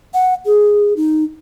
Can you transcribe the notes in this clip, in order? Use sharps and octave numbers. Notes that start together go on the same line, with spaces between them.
F#5
G#4
D#4